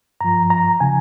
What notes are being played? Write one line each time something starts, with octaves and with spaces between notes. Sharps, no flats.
G2 F3 A#5
A#5
C#3 F3 G#5